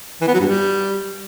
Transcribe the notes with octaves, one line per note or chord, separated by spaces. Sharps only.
E3
B3
F#3
G2
G3